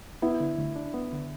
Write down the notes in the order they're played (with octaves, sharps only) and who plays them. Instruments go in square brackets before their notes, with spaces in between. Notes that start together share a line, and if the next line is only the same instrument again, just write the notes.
[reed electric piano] B3 [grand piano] E4
[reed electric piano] D3
D2
D4
B3
D3